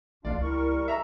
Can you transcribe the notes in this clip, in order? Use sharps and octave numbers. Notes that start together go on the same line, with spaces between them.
C#2 A#3 D4 F4 D5 F5
G3 E4 A#4 C#6
E5 A#5